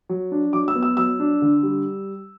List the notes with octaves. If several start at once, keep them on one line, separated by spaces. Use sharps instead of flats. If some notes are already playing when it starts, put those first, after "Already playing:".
F#3
D4
F#3 D6
E6
B3
E6
F#3 E6
D4
D3
G3